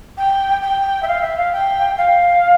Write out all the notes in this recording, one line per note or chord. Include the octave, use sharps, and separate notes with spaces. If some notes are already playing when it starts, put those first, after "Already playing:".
G5
G5
E5
F5
E5
F5
G5
F5